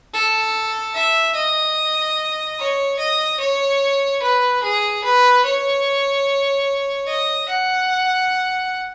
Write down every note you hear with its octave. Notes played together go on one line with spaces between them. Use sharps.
A4
E5
D#5
C#5
D#5
C#5
B4
G#4
B4
C#5
D#5
F#5